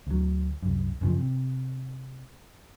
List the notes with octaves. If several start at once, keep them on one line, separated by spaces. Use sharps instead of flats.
D2 F#3
C2 F#2
F#2 C#3 F3
C3